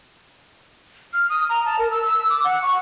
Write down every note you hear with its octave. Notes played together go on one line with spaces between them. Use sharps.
F6
D#6
A#5
A5
A#4
E6
E6
D6
F#5
C#6